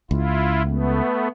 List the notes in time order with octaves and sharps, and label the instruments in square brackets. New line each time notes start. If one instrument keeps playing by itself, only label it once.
[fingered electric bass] C#2 [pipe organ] E4 F4
[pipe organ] A3 B3